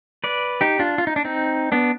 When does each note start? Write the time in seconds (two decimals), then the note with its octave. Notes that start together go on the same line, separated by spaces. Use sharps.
0.24 B4 D5
0.61 D#4 G4
0.79 D4 F4
0.98 F4
1.07 D#4
1.16 D4
1.25 C4 D#4
1.72 B3 D4